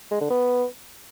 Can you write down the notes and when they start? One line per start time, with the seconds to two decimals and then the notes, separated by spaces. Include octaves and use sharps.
0.11 G#3
0.21 D3
0.30 B3